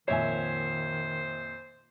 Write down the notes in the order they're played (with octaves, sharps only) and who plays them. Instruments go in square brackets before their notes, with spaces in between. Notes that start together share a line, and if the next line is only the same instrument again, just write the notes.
[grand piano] F2 A#2 [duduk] D#3 [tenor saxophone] C5 [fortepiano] C#5 E5 G#5